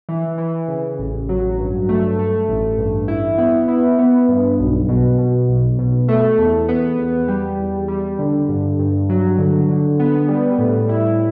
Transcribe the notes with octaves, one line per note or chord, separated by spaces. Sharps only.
E3
E3
C#3
A1
F#3
G2
A3
A3
A1
G2
E4
B3
E4
B3
G2
B1
B2
B2
B1
B2
A3
E2
B3
E2
G3
E2
G3
D3
G2
G2
F#3
D3
D3
B3
G3
A2
E4